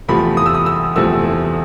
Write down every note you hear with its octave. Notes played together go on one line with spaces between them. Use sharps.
E2 C3 F3 A3 B5
D#6
E6
D#6
E6
E2 C3 F3 A3 E6